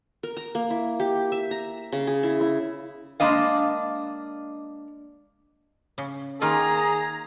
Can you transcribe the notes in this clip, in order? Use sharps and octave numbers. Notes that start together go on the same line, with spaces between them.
A#4
A#5
A#3
E4
G4
E5
A#5
C#3
G#4
E4
E4
G#3 A#3 D4 D#5 F5
C#3
D#3 A#3 F4 G#4 A#5